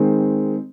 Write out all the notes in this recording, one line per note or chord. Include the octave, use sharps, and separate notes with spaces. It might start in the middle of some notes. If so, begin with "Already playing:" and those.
Already playing: D#3 G#3 C4